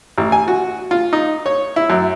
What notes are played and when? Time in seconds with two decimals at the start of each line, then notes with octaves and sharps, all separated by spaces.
0.18 A1
0.32 G#5
0.48 F#4
0.91 F4
1.13 D#4
1.46 C#5
1.76 E4
1.90 F#2